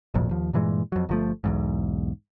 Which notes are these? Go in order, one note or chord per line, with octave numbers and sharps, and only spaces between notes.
D1 G#1 F2 A#2
D#2 F3
G2 A#2 E3 G#3
F2 F#3
G1 F3 A3
B1 E2 G#2